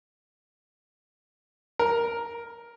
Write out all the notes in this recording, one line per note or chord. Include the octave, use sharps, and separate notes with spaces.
A#4